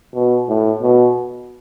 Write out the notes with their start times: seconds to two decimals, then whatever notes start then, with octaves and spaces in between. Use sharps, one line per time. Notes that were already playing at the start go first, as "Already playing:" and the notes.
0.15 B2
0.49 A2
0.82 B2